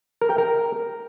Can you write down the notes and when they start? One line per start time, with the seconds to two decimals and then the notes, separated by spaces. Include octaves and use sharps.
0.22 A#4
0.30 G5
0.38 A#4